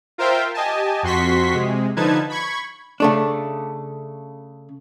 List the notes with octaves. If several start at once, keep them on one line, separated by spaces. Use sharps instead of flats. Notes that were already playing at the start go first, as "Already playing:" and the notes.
F4 A#4 C5 E5 F5 G5
G4 D#5 G#5 A5
F2 F#4 C6 C#6 B6
C3 G#3
D3 F3 D#4 B4 A5 G#6
B5 C#6 G#6
C#3 A3 D4